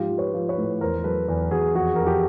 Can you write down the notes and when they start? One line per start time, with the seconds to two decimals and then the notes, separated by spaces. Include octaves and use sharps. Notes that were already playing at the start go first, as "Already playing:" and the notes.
Already playing: G#2 F3 F4 G4
0.10 F3
0.18 B4 C#5
0.34 F3
0.49 B4 C#5
0.58 A2
0.81 E2 A#4 C5
1.04 F#3 A4 B4
1.29 E2
1.51 E2 F#4 G#4
1.75 F2 F#4 G#4
1.96 F2 A#4
2.06 G4 A4